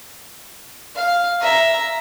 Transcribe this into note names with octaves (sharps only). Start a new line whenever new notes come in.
F5
E5 A#5